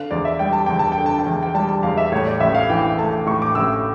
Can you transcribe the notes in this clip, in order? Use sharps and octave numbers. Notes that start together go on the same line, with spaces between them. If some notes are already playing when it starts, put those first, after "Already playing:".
Already playing: D3 F5
E2 D5
E5
G3 G5
A5
E2 G5
A5
G5
D3
A5
G5
E2
G5
G3 A5
A5
E2 F5
E5
A2 C#5
D5
A1 E5
F5
E3 G5
A3 A5
A2 C#6
D6
A1 E6